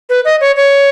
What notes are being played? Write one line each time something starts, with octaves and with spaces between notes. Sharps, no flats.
B4
D#5
C#5
C#5